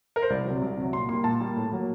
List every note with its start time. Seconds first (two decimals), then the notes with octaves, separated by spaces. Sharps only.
0.16 A#4
0.22 C5
0.30 C2 D5
0.45 F#3
0.50 C3
0.62 C2
0.77 C3 F#3
0.93 A#2 C6
1.09 G3 A#3 C6
1.24 A#2 A5
1.40 G3 A#3
1.57 A2
1.72 F#3 A#3